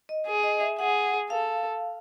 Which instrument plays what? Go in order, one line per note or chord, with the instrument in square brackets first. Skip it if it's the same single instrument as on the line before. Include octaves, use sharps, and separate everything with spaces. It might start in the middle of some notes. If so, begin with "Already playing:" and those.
[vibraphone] D#5
[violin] G#4
[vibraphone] D#5
E5
[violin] G#4 [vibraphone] F#5
[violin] A4 [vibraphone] F5